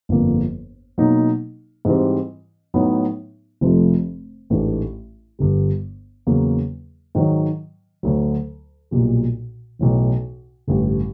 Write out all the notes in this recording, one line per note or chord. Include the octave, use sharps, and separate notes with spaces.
G1 F2 D3 F3 A#3
B2 F#3 A#3 D#4
G#2 E3 G3 C4
A2 F#3 B3 D#4
F1 F2 C3 F3 A3
A1 G#2 E3 A3 D4
G1 G2 D3 G3
E2 C#3 F#3 A#3
G#2 D#3 F#3
D2 D3 F#3
B1 A#2 G3
B1 A2 E3
A1 G2 D3